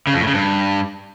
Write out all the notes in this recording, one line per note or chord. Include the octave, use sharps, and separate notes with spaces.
C#3
F2
A2
C#3
G2